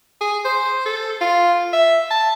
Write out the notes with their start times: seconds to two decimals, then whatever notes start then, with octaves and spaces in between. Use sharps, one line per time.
0.21 G#4
0.45 C5
0.86 A4
1.21 F4
1.73 E5
2.11 A5